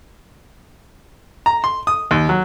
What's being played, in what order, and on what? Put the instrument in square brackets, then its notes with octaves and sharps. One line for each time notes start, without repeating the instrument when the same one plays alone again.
[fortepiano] A#5
C6
D#6
D#2
F#3